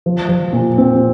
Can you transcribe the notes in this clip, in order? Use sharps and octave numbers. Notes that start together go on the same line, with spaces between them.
F3
F3
A#2
C4